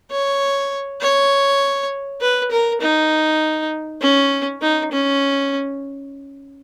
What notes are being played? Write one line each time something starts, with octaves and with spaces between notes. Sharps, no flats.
C#5
C#5
B4
A#4
D#4
C#4
D#4
C#4